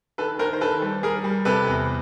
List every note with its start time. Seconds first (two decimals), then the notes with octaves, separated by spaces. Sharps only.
0.18 D#3 A4 B4
0.39 D#3 A#4 C5
0.53 C5
0.61 D#3 A4 B4
0.82 G3
1.03 G3 G#4 A#4
1.24 G3
1.45 C3 A4 B4
1.67 E2